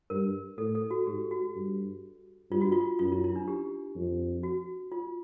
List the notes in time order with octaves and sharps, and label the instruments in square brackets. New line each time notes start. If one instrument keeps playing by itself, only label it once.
[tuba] G2 [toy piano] A#4
[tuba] A2 [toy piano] A4
[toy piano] A4
F#4
[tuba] G#2 [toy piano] G4
[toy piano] F#4
[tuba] G2
[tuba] G2 [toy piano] F4
[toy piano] F#4
F4
[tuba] F#2 [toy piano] F4
[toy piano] E4
E4
D4
G4
[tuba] F2
[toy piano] F#4
F4